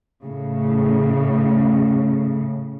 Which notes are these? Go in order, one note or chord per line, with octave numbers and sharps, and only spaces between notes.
A2 C#3